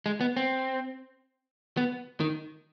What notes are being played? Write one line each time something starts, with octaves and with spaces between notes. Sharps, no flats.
G#3
B3
C4
B3
D#3